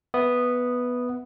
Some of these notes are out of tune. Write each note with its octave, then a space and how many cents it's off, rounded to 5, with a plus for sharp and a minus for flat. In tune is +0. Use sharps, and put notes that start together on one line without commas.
B3 +0 E5 +0 D#6 -10